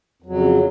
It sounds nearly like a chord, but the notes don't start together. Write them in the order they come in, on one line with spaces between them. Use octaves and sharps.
F2 F#3 C#3